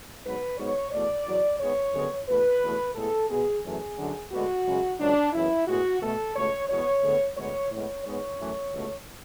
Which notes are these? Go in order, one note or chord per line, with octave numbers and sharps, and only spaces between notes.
G#2 F#3 B3 B4
G#2 F#3 B3 C#5
E2 B2 A3 D5
E2 B2 F#3
G#2 G#3 B3 C#5
F#2 D3 G#3 B3
E2 B2 A3 B4
E2 B2 A3
A2 G#3 B3 A4
B2 G#3 B3 G#4
F#2 E3 A3 G#4
F#2 D3 F#3
D2 D3 G#3 B3 F#4
F#2 C#3 G#3
C#2 C#3 F#3 D4
F#2 C#3 E3 B3 E4
A2 G#3 B3 F#4
B2 A3 A4
C#2 B2 A3 C#5
E2 B2 G#3 B3 C#5
D2 D3 G#3 B3
D2 D3 G#3 B3 C#5
A2 G#3 B3 C#5
G#2 G#3 B3 C#5
F#2 E3 A3
C#2 B2 A3